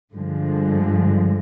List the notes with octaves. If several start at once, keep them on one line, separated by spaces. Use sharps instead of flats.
G2 D3 F3 G#3